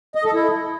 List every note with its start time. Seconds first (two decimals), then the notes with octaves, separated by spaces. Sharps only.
0.15 D#5
0.24 A4
0.34 E4